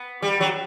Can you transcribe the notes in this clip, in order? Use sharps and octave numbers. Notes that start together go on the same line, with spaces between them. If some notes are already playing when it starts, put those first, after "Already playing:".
Already playing: B3
G3
F#3